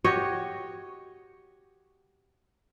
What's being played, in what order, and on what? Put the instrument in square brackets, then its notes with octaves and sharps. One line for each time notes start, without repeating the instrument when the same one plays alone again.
[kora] F#4 G4 C#5 D#5